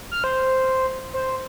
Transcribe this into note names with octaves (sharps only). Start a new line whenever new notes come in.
F6
C5
C5